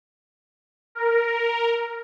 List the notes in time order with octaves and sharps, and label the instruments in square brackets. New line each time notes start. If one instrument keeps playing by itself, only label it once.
[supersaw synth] A#4